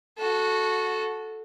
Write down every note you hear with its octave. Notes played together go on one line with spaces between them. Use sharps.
F#4 A4